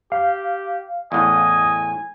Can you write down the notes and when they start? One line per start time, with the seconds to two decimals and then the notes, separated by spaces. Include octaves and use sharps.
0.12 G4 F5
1.12 E2 A2 D#5 G#5